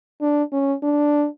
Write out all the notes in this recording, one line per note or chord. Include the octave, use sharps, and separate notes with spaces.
D4
C#4
D4